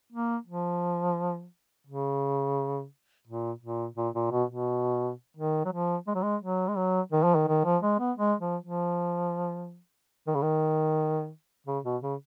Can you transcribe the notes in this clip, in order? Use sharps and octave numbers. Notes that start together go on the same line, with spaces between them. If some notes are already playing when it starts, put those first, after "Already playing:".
A#3
F3
C#3
A#2
A#2
A#2
A#2
B2
B2
D#3
F#3
F3
G#3
F#3
G#3
F#3
G#3
F#3
D#3
F3
D#3
D#3
F3
G#3
B3
G#3
F3
F3
D#3
C#3
D#3
C#3
B2
C#3